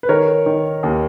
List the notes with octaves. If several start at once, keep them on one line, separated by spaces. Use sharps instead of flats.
B4
D#3 A#4 C#5
D#3
D#2